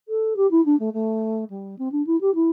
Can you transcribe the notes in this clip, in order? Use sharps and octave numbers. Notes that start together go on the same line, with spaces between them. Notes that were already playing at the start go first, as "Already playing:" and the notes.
A4
G4
E4
D4
A3
A3
G3
C4
D4
E4
G4
E4